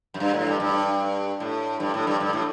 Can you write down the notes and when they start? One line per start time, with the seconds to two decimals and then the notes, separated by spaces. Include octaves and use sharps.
0.14 F#2
0.20 G2
0.34 A2
0.47 G2
0.60 G2
1.40 A2
1.80 G2
1.94 A2
2.07 G2
2.20 G2
2.33 A2